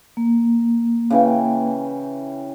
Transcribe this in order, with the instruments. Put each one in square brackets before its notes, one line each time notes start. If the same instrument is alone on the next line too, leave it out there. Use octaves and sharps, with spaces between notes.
[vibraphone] A#3
[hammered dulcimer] C#3 E3 G5